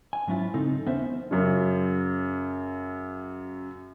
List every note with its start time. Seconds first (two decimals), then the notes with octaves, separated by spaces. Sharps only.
0.13 G#5
0.27 G#2 F#3 C#4 E4 F4
0.54 C#3 C4 D#4 A4
0.86 D#2 B3 C#4 C5 E5
1.31 F#2 C#3